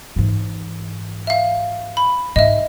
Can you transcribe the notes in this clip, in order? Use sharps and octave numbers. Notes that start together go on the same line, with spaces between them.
G#2 E3
E5 F5
B5
G#2 D#5 E5